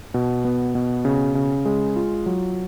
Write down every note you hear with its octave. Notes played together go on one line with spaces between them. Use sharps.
B2
B3
B2
C#3
C#3
G#3
F4
F#3